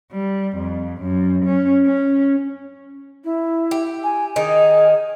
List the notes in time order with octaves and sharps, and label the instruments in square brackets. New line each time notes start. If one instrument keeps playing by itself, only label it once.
[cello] G3
F2
F#2
C#4
C#4
[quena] E4
[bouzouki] G4
[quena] G#5
[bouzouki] D#3 D#4 [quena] G#4